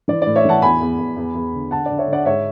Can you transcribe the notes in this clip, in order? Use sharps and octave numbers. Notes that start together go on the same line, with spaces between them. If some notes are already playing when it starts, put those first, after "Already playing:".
E3 D5
A2 D5
C#5 E5
E3 F#5 A5
E2 G#5 B5
E2
E2
E2
E2
D3
D3 F#5 A5
D3 D5
C#5 E5
D3 D5 F#5
G#2 C#5 E5